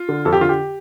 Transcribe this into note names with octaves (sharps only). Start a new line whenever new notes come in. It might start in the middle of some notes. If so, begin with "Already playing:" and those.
Already playing: F4
D3
F2 A4
G4
D3 F4
G4